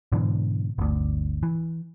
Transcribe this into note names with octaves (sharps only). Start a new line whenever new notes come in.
G#2 B2 D3 E3
G1 D2
E3